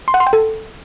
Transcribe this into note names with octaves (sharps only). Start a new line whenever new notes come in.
C6
F#5
C6
G5
A4